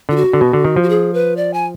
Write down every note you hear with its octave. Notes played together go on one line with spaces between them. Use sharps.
D3 F4
F#4
D3
B2
D3
D#3
F3
F#4
G#4
B4
D5
G#5